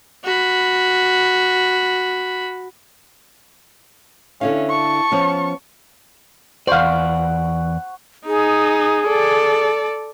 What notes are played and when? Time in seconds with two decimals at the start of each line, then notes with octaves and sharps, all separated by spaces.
0.24 F#4 B5
4.41 D3 C#4 E4 F5
4.71 A5 C#6
5.12 F3 B3 C#4
6.67 E2 C5 D5 F5 F#5 B5 C#6
8.26 D#4 G#4
9.07 A4 D5